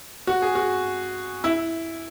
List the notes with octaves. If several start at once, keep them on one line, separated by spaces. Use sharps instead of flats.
F#4
G#4
F#4
E4